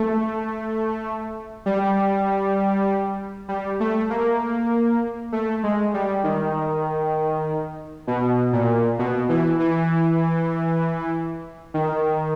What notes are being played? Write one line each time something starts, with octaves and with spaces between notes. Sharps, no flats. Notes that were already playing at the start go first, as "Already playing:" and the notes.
Already playing: A3
G3
G3
A3
A#3
A3
G#3
G3
D#3
B2
A#2
B2
E3
E3
D#3